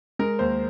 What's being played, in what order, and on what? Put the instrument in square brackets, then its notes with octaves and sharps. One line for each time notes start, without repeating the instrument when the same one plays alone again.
[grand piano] G#3 A#4
D#2 C5